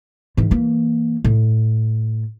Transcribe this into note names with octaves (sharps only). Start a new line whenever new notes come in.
G#2 E3
E3 A#3
A2